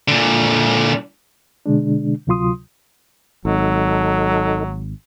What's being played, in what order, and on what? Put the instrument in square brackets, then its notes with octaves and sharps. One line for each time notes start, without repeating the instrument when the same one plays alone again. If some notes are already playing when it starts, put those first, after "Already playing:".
[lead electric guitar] A#2 D3
[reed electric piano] B2 D3 G#3 D4
D2 C3 F#3 F4 C6 D#6
[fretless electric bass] G#1 [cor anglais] F#3 [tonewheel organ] D#4 A4